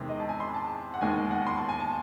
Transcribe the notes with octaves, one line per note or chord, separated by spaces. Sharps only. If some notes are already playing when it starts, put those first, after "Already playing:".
Already playing: E2 C3 D#3 G#3
D#5
A5
G#5
C6
G#5
A5
F#5
E1 D#2 D#3 G#3 G#5
F#5
C6
A5
G#5
A5